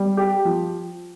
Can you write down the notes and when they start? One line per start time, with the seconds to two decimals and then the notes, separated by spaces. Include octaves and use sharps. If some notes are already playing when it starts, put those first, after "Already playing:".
Already playing: G3
0.17 G4
0.45 F3